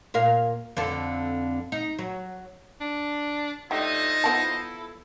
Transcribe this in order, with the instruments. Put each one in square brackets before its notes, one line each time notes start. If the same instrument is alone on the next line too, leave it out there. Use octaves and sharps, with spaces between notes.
[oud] A#2 A#4 F5
F2 D3 A4
D#4
F#3
[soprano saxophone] D4
[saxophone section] A3 D4 E5 [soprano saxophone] D#4 [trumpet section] F4 C5 D#5 [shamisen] G4
[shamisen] F3 B3 A5 [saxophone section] E4 A4